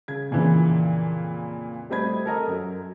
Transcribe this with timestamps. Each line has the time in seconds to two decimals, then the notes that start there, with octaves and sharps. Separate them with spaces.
0.08 C#3 G#6
0.31 F2 A#2 C#3 E3
1.90 G3 A3 C4 D#5 B5 G#6
2.25 A4 A#4 D#5
2.47 F#2 F#3